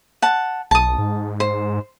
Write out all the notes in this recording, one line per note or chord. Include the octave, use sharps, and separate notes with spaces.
F#5 A5
B1 A5 D#6
G#2
C5